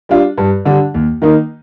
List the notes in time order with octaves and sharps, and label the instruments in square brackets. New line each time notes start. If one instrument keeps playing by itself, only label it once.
[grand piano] G3 D4 F4
G2
D3 G3 D4
D#2
D#3 A#3 D#4